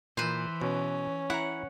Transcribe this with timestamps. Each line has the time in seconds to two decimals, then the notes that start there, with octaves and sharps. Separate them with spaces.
0.17 A#2 E3 B4 C5
0.61 B2 C#4
1.30 E4 F#5 A#5